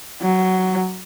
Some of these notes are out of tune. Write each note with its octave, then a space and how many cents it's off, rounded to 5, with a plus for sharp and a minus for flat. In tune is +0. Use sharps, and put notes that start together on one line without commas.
F#3 +10